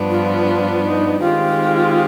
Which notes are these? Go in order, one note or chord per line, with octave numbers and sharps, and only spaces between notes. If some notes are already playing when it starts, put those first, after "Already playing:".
Already playing: G2 F3 B3 D4
F4
F4
D#4
D#3 G#3 C4 F4 G4